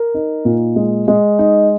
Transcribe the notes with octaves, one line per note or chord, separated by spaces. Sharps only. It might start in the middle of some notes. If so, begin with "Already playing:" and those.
Already playing: A#4
D#4
A#2
G#3
G#3
D#4